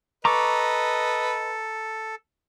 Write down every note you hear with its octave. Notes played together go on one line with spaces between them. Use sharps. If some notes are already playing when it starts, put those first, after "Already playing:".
A4 B4 D#5 A#5 C#6 D6